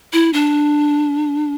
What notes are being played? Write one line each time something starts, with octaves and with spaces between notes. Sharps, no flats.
E4
D4